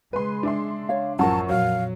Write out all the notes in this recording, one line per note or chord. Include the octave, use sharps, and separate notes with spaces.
C#3 G#3 B4 C6
D4 E5 C6
C#5 F5
A1 F#2 F3 A#4 F#5 A5 C#6
F2 A#2 F#3 F5